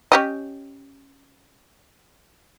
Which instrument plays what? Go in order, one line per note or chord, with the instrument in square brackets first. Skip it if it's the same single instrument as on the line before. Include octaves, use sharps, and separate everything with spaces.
[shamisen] C#4 G4 D#5